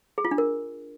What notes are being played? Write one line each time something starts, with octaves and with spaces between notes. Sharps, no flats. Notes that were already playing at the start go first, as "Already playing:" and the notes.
G#4
F4
D4
A#4